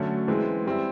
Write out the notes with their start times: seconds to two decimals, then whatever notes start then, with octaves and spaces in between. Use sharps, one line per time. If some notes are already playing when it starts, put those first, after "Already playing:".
Already playing: D3 F#3 A3 C#4
0.28 E3 G#3 C4
0.66 G3 C4 E4